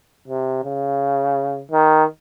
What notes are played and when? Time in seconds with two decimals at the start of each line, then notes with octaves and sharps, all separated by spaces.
0.28 C3
0.64 C#3
1.72 D#3